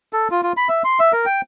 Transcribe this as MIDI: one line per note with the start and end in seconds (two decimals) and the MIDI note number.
0.13 0.28 69
0.31 0.41 65
0.43 0.53 65
0.57 0.68 83
0.69 0.82 76
0.84 0.99 84
1.00 1.12 76
1.12 1.25 70
1.26 1.41 79